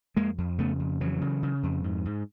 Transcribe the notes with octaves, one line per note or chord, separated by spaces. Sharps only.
F2 G#3 A#3
F2
C#3 A3 B3
F2
C#3 E3 F#3
C#3
C#3
F2
G#2
G#2